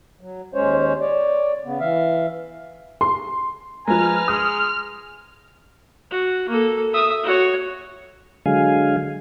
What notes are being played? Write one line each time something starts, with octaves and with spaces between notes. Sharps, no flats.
F#3
D#2 G#3 C#4 C5 C#5
C#5 D5
C#3 B3
E3 E5 F5
C6
F3 G#3 B4 G#5 A#5 F6
G#3 D#6
F#4
A#3 A4
E5 D#6
F#4 C#5
D3 F#3 G#3 F5 G#5